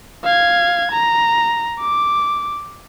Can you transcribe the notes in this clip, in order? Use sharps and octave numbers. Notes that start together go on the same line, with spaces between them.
F5 G#6
A#5
D6